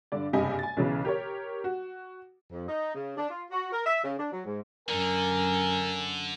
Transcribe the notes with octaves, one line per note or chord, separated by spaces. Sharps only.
G2 D3 D5
F#1 G2 C3 G4 D#5 G#5
G#5 A6
B1 C#3 E3
G4 A#4 C#5
F#4
F2
D#4
C#3
D4
F4
F#4
A#4
E5
C#3
D4
F#3
G#2
F#2 D3 A#4 G#5